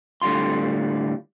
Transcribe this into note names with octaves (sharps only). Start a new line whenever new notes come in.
A2 D3 G3 F4 C6